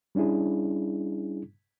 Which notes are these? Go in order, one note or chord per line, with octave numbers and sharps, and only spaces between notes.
G3 C#4 D4 E4 G#4